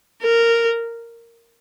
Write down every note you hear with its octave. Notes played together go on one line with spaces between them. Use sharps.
A#4